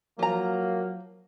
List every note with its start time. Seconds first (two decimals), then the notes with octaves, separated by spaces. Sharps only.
0.19 F3 F#3 A#3 A#5